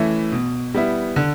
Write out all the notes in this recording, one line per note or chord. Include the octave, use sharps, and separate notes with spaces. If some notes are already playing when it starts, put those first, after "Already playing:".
Already playing: E3 A3 C#4 E4
B2
G3 B3 E4
D3